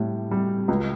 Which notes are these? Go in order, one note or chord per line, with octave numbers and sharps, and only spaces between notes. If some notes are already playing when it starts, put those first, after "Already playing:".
Already playing: A2 G3
G3
C#2